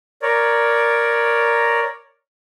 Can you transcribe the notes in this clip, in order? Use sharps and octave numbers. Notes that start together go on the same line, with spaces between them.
A#4 C#5 D5